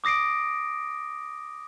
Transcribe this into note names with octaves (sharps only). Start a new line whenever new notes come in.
D6 D#6 A#6 C7 D7